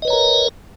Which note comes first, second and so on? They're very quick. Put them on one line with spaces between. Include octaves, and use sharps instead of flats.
D#5 B4 C#5 A#5 A#4